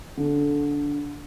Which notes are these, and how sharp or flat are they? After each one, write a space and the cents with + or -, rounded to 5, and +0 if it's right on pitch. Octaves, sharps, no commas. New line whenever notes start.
D3 -15